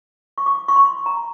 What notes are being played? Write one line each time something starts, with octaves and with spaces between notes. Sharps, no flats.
C#6
D6
C#6
C6
A#5